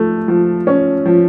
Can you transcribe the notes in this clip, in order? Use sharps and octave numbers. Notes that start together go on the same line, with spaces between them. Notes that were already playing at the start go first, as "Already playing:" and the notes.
Already playing: F3 A3
F3
C#4
F3